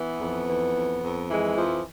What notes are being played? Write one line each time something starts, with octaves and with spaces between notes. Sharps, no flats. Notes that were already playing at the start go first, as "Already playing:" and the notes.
Already playing: E3 B3
F2
E3
F2
F2
E3 G#3
F2 F3